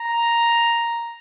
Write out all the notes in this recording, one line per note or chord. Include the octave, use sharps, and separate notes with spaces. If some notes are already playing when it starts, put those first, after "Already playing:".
Already playing: A#5